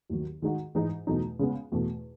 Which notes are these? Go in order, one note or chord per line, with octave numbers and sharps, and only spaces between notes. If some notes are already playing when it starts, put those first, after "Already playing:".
D#2 D#3 F#3
D#3 G#3 D#4 F#4
G#2 E3 G#3 D#4
E2 B2 F#3 A3 D#4
C#3 G#3 B3
E2 B2 A3